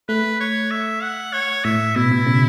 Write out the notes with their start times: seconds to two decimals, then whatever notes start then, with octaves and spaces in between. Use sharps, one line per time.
0.09 A3 B4
0.40 C#5
0.71 E5
1.02 F#5
1.33 C#5
1.65 A2 E5
1.96 B2 E4
2.11 B2
2.27 C#3